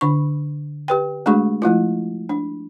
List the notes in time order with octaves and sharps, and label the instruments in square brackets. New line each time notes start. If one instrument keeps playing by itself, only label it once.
[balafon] D3 D4 C#6
G4 B4 G5
G#3 A3 D4 F#4 G#4 C#6
F3 A3 E4 F4
D4